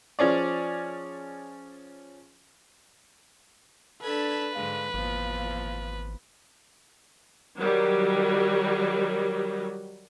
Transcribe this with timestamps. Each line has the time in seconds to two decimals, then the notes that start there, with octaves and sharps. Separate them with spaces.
0.19 F3 C#4 G#4 D5
4.02 D4 A4 B4 A5 B5 G#6
4.55 G#2 D3 G#3 F5
4.94 G#1 E2 A#2 F3 F5
7.59 D#3 F#3 G3